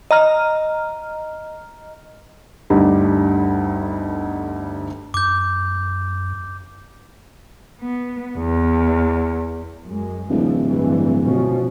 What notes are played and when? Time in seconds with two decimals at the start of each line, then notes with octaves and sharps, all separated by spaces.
0.11 D#5 A#5 F6
2.70 G1 D2 G3 D#4
5.14 F#2 D6 G6
7.81 B3
8.38 E2
9.84 F#2 G#3
10.30 D1 E3 F3
10.65 G2 C3 E3
11.24 B2 F3 C#4